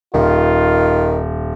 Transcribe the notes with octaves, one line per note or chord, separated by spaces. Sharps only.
D#1 D#3 F4